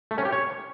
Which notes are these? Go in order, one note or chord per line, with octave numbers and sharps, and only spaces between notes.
A3
C#4
G4
C#5